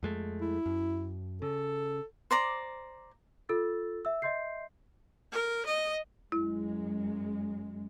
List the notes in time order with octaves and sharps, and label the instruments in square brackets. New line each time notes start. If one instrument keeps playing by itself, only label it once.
[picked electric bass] F2 G#3 A3
[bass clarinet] E4
[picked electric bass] F#2
[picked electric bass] C#3 [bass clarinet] A4
[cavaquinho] C5 D5 A#5 D6
[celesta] F4 A4 E6 A6
E5 E6
D#5 E5 C6 G6 C7
[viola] A#4
D#5
[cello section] F#2 G#3 [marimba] E4